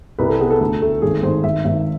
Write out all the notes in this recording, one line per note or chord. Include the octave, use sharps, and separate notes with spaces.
C2 B4
A4
B3 G#4
A4
D2
A3
G#1 G#4
G#1 C5
G#1 E5
G#1 E5